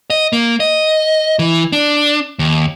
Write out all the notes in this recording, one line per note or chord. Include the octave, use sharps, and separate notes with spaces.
D#5
A#3
D#5
E3
D4
D#2